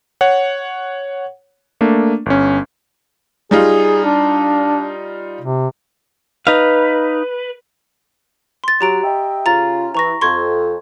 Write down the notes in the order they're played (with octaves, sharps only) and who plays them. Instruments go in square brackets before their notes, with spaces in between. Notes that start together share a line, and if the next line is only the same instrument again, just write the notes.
[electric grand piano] C#5 F#5
A3 A#3 D4
G1 C#4
[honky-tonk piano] G3 D#4 F4 [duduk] G#4
[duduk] D4
C3
[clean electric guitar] D#4 F5 [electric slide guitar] B4
[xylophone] C6 A6
[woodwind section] F#3 [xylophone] G4 A#5 D7
[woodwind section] D#5 E5 G5
[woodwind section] C#3 C#4 F4 [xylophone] A#5 A6
[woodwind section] E3 [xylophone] A#5 C#6 A#6
[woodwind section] F2 [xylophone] C6 C#6 G#6